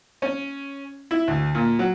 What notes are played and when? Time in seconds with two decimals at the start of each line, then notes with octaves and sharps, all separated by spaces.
0.22 C#4
1.11 E4
1.28 D2
1.55 A#2
1.79 F#3